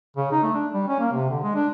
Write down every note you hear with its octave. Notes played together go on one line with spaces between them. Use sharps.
C#3
D#4
A3
D4
G3
C#4
A#3
C3
D3
G#3
D4